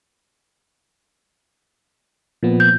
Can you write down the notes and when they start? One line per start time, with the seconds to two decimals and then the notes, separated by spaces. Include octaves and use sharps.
2.43 A#2 F3 B3
2.60 G6